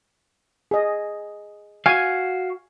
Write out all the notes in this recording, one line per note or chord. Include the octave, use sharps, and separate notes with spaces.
G#4 D#5
F#4 F5 G#5